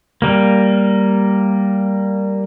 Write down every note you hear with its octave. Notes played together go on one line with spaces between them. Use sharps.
G3 A#3